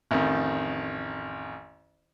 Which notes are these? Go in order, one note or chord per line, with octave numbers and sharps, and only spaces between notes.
A1 F2 D#3